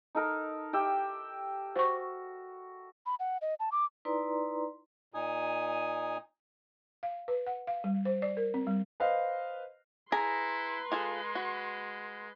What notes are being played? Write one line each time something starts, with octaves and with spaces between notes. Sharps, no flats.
D#4 A4 A#4
G4 E5 G5
F#4 C5 C#6
B5
F#5
D#5
A5
D6
D#4 E4 B4 D5 A#5 C6
A#2 D#4 G#5 D#6
F5
B4
F#5
F5
G3
C5
D5
A#4
C4
G3
B4 C5 D#5 F5
E4 G#4 B4 A#5 C6
G#3 F4 G#4 A4
F#4